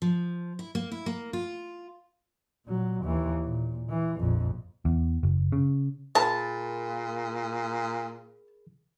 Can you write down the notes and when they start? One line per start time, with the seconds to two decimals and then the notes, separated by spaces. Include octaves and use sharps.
0.02 F3
0.59 E4
0.75 A#3
0.91 E4
1.06 A#3
1.33 F4
2.67 A#2 F#3
3.04 D#2 E3
3.45 A#2
3.90 E3
4.20 A#1 F2
4.85 E2
5.23 F#1
5.52 C#3
6.15 A#2 G#4 A#4 A5 B5